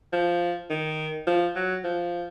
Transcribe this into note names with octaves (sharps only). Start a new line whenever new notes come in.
F3
D#3
F3
F#3
F3